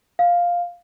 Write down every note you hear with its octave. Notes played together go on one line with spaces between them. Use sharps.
F5